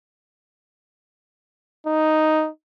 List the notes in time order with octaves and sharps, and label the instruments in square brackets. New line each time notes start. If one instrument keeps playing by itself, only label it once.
[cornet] D#4